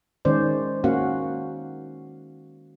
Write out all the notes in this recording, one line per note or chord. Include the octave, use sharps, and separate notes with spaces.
D#3 G#3 C#4 C5 D5
A#3 C#4 F#4 F5 F#5